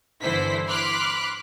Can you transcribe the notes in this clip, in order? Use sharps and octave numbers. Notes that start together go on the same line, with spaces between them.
G1 D3 E3 E4 C5 B6
B5 C6 D6 F6 F#6 B6